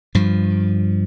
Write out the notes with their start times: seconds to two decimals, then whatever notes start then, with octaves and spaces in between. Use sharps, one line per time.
0.15 G2 F3